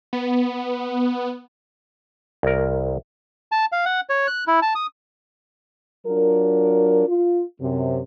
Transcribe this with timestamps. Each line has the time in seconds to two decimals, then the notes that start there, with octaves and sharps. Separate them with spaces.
0.13 B3
2.43 C2 A#4
3.52 A5
3.72 F5
3.85 F#5
4.10 C#5
4.28 F#6
4.47 E4
4.62 A5
4.75 D#6
6.06 F#3 D4 F4 A#4
7.07 F4
7.61 F#2 C3